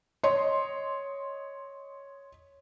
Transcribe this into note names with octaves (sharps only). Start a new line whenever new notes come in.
C#5 D#5 C6